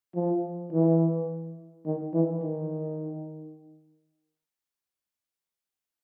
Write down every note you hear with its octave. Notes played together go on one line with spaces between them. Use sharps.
F3
E3
D#3
E3
D#3